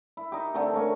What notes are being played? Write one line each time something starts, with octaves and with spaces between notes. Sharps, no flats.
E4
D#4 G4
D3 A3 C4
A#3 C#4